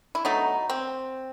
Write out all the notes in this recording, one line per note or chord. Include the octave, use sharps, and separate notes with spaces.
E4
B2 F#3 A3 D#4
C4